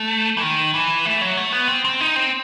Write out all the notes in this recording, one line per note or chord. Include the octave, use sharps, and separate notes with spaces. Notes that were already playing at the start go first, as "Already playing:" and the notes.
Already playing: A3
E3
D#3
E3
A3
F#3
A3
B3
C4
C4
D#4
C4